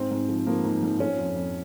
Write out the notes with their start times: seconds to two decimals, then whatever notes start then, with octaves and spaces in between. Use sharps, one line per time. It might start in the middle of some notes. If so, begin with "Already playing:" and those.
Already playing: G#2 C4
0.11 G#2
0.29 F3
0.46 F3 A#3
0.64 G#2
0.83 G#2
1.00 F3 C#4
1.18 F2
1.36 F2